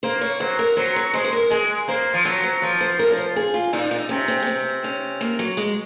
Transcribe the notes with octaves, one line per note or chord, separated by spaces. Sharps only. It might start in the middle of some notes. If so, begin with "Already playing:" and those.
A#3 C5
C#5
F#3 C5
A#4
F#3 C5
C#5
G#3 C5
C5
A#4
G#3 G#4
A#3 C5
F3
F#3 C#5
C5
F3 C#5
C5
A#4
C#5
C5
G#4
F4
A#2 D#4
D#4
C3 C#4
C4
C#4
C4
C#4
A#3
F#3
G#3